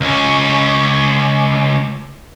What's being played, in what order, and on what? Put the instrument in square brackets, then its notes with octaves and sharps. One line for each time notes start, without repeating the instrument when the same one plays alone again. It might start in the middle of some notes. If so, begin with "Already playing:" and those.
[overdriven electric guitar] C#2 C#4